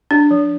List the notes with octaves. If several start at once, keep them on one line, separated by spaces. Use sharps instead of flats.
D4
F3